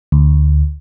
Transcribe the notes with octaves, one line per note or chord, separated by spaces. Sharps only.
D2